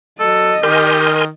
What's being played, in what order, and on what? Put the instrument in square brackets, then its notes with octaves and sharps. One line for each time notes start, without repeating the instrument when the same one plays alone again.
[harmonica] F#3 [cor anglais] A4 [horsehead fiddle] D#5
[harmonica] D#3 [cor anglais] G4 [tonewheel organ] A#4 G#5 C6